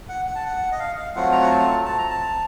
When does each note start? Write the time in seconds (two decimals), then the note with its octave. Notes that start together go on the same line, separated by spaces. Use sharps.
0.09 F#5
0.27 F#5
0.35 A5
0.45 F#5
0.72 D#5
0.79 F5
0.97 F5
1.16 F#3 A3 C4 F4 F#5
1.32 A#5
1.42 F#5
1.50 A5
1.85 A5
1.98 A#5
2.10 A5